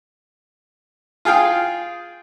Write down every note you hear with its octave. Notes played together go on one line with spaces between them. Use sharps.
F4 G#4 F5 G5